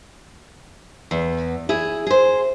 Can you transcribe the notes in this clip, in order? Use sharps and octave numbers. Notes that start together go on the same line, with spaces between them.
E2
E4 G#4
G#4 C5